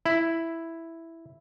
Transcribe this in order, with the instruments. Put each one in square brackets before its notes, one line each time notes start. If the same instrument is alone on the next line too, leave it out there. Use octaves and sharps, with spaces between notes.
[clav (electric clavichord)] E4